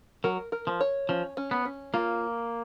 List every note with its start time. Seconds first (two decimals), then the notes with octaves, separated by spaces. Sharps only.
0.24 F#3 A#4
0.52 A#4
0.67 F3
0.80 C#5
1.09 F3 C#4
1.37 C#4
1.51 B3
1.65 C#4
1.94 A#3 F4